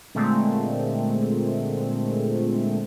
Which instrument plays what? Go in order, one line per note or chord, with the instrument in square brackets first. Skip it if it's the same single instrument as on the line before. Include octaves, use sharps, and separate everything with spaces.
[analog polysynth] A#2 D3 G#3 A3 C4